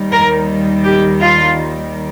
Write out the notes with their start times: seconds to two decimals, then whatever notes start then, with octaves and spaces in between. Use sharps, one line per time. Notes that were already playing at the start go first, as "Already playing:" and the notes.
Already playing: D#2 D#3 G3
0.11 A#4
0.84 G4
1.20 F4